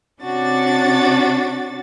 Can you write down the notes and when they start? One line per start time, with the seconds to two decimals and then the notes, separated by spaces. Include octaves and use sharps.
0.22 C3 C#4 D4 F#4 A6